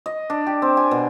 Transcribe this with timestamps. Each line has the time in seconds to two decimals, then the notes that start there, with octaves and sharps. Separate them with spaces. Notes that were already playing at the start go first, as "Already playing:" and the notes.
0.06 D#5
0.30 D4
0.47 G4
0.62 C4
0.77 G#5
0.91 B2